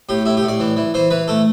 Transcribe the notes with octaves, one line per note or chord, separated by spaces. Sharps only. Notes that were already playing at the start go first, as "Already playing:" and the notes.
A2 G4
A2 E4
G4
A2
D5
E3
E3
E3 C5
E3 B4
A3 A4